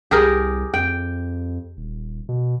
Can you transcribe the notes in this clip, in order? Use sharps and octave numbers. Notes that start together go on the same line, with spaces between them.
C2 G4 G#4 A#4
F2 G5
D#1
B2